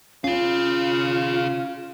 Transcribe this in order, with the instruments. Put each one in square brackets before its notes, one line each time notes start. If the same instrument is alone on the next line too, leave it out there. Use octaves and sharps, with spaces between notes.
[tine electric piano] C#4 [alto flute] F4 [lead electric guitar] G#4 F5